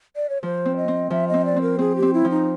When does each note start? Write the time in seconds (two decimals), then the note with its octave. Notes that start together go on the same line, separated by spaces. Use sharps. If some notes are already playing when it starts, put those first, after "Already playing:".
0.16 D5
0.29 C#5
0.43 F3 C5
0.65 C4
0.77 D#5
0.88 C4
1.10 F3 E5
1.28 D#5
1.34 C4
1.45 D5
1.56 C4
1.62 A#4
1.79 C4 G#4
1.96 G4
2.02 C4
2.14 E4
2.25 F3
2.30 D#4